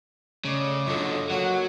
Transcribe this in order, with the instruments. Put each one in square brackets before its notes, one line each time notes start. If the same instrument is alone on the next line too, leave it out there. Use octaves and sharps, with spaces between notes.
[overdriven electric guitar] C#3 [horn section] A3 D5 D#5
[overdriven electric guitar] F#2 D3 [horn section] F4 A4 D#5
[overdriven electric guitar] F#3 [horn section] A#3 C#5 F#5